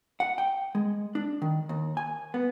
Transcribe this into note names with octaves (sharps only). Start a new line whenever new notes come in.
F#5
G5
G#3
D4
D#3
D#2
G#5
B3